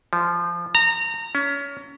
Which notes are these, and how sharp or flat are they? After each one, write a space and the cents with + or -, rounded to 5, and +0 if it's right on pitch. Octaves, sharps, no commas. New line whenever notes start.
F3 -15
A#5 -25
C#4 +25